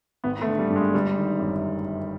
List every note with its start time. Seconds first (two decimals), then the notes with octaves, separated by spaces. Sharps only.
0.24 G#1 B3
0.41 A3
0.47 D3
0.59 G3
0.70 G2
0.76 G#3
0.94 G1 G3
1.18 D#3
1.40 F#2